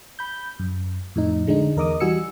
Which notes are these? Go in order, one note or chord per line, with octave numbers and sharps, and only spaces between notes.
B5 G6
F#2
F2 A2 D#4
D3 G#3 D4 D#4
E2 A#4 D#5 D6 D#6
E3 G3 F#4 G#5 E6 C#7